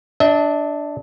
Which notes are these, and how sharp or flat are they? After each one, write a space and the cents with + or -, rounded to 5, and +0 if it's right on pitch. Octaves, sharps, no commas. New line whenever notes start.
D4 +0 E5 -45